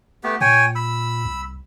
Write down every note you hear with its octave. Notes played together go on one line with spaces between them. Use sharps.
A3 B3 G4
A#2 C#5 G5 G#5
B5 E6
C2